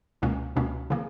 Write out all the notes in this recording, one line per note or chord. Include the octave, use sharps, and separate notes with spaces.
C#2 B2 A#3 C#4
C#2 B2 A#3 C#4
C#3 E3 A#3